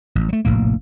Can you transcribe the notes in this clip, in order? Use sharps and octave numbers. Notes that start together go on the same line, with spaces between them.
A1
F#3 A3
F1 A#1 A2 A#3